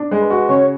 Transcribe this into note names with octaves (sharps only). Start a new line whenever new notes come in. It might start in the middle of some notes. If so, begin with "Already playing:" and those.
Already playing: D4
G#3
B4
F#4
C#3 C#5